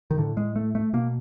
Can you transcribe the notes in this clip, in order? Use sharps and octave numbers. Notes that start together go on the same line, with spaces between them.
D#3
A2 D3
G#3
A3
A3
B2 A#3